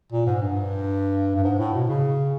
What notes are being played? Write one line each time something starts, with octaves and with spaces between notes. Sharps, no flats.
A#2
G#2
G2
G2
G#2
A2
B2
C#3